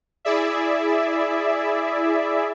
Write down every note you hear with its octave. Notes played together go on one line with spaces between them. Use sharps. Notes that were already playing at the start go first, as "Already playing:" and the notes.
E4 G#4 D5 E5